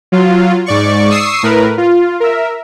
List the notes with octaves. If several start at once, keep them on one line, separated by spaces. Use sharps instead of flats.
F#3 F4
G#2 D5 C#6
C#6 D#6 E6 C7
A2 A#4 B4
F4
A#4 E5